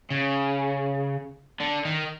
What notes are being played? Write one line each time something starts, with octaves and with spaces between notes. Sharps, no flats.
C#3
D3
D#3